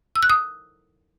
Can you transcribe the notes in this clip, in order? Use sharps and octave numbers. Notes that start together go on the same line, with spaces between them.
E6
F#6
D#6